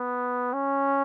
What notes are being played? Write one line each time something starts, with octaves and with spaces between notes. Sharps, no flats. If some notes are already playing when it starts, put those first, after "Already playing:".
Already playing: B3
C#4